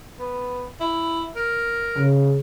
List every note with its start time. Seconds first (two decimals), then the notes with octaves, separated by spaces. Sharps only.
0.19 B3
0.80 E4
1.36 A#4
1.98 C#3